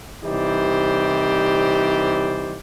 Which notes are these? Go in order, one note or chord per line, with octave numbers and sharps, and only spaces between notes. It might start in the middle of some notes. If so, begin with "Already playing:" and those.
C2 E3 D#4 G4 C5 D5